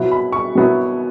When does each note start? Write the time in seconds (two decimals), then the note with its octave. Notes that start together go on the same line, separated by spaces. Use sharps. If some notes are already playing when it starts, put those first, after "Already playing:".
Already playing: B2 F#3 B3 E4
0.12 B5
0.33 C#6
0.55 B2 F#3 B3 E4